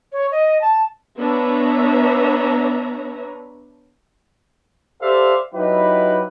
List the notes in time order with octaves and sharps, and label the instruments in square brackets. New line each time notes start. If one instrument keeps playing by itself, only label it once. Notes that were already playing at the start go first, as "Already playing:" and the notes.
[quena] C#5
D#5
A5
[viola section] B3 D4 B4 C#5 E5 A#5
[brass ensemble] G4 A4 C5 D5 E5 F5
F#3 D#4 E4 G4 B4